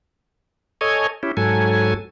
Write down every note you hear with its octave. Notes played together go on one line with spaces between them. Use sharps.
A4 C#5 D#5 G#5
C#4 E4 G4
G#2 F#3 A4 G#5